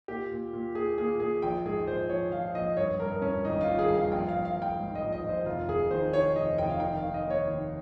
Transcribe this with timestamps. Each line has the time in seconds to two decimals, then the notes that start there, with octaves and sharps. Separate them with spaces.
0.08 A#2 G4
0.31 A#2
0.53 A#2
0.75 A#2 G#4
0.98 A#2 G#4
1.20 A#2 G#4
1.42 A#1 G5
1.65 G#2 G#4
1.87 A#1 C5
2.09 F3 C#5
2.32 F3 F5
2.55 A#1 D#5
2.77 G2 C#5
3.00 G2 A#4
3.22 G2 C#4
3.45 G#1 D#4
3.61 F4
3.66 D#3
3.79 G#4
3.89 G2
3.95 F5
4.11 A#1 G5
4.29 F5
4.34 A#1
4.45 F5
4.57 A#1
4.62 G5
4.79 G#2
4.95 D#5
5.02 A#1
5.12 D#5
5.24 A#1
5.29 C5
5.46 F1 F4
5.68 F1 G#4
5.91 D#3 C5
6.13 D#3 C#5
6.36 F1 D#5
6.58 F1 G5
6.69 F5
6.80 D#3 G5
6.97 F5
7.03 D#3
7.14 D#5
7.25 D#2
7.30 C#5
7.47 D#2